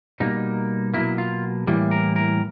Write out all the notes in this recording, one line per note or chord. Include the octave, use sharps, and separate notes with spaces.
B2 G3 A#3 D#4
B2 F#3 A#3 E4
F4
A2 E3 G3 A#3
A#4
A#4